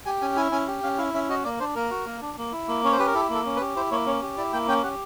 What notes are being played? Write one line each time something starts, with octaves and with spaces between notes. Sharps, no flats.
G4 G#5
C#4 G#5
E4 G#5
C#4 G#5
G4
C#4 F5
E4 F5
C#4 E5
F#4 D#5
A#3 D5
D4 C5
A#3 A#4
F#4
A#3
D4
A#3
E4
A#3
C#4 C#5
C5
G4 B4
A#4
E4 A4
A#3
A4
C#4
B4
G4
E4 C5
A#3 C#5
C#4 C#5
G4
E4 D5
A#3 G5
C#4 G5
G4 F#5